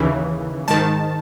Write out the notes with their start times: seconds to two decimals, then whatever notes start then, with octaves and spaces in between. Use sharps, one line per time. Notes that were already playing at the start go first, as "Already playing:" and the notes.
Already playing: D#2 C#3 E3
0.68 G#2 D#3 A5